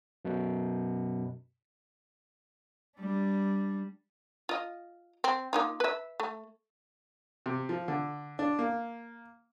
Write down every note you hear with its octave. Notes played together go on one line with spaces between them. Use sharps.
F#2 B2
G3 D4
F4 D#5
C4
A#3 D#4 F4
B4 E5
A3
C3
F3
D3
D4
A#3